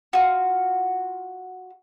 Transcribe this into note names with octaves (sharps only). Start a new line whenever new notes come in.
F4 F#4